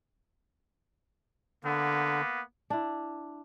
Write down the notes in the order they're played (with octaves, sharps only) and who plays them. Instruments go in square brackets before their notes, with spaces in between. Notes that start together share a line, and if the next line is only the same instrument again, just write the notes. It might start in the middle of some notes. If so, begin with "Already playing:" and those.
[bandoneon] D3 [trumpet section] A#3 B3
[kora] D4 E4